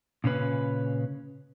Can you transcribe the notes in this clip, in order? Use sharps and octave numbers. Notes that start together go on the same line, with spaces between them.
A#2 C#3 C#4 B4